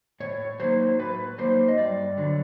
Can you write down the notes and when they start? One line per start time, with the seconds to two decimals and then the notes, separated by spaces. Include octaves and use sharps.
0.20 A2 C#5
0.60 F#3 A#3 D#4 C5
0.99 A2 B4
1.38 F#3 A#3 D#4 C5
1.68 D#5
1.78 G2 D5
2.17 D3 F#3